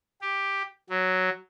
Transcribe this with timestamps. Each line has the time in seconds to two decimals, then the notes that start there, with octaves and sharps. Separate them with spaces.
0.21 G4
0.89 F#3